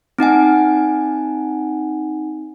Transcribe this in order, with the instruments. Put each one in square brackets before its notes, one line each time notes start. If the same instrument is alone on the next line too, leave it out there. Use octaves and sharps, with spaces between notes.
[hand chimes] C4 D#4 F#5 G#5